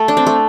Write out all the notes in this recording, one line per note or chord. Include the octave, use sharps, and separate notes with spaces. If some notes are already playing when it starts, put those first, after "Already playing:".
Already playing: A3
D4
C4
A3